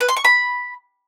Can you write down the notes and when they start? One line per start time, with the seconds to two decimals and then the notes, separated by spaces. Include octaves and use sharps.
0.01 B4
0.09 C6
0.17 C#6
0.24 B5